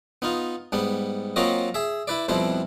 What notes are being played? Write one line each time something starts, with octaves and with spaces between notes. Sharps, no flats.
B3 D#4 F4
G#2 G3 B3
F#3 A#3 C4 F4 F#4 D#5
G#4 E5
E4 B4 D5
F2 B2 G3 C4 E4